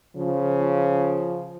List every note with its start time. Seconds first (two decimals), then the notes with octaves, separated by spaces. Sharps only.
0.17 C#3 F3